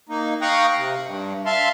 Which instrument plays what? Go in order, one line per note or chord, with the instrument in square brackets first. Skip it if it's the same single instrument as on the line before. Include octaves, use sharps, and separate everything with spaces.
[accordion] A#3 D#4
F5 G5 A#5 C#6 D#6 F#6
C3
G2
E5 F5 A5 C6